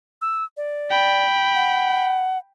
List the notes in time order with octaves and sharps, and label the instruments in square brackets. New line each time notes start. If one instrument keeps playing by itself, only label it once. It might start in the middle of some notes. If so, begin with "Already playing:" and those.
[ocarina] E6
D5
[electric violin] G5 B5
[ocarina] F#5